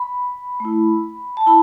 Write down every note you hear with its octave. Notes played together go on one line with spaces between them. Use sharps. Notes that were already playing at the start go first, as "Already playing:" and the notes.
Already playing: B5
A3 E4
A5
E4 B5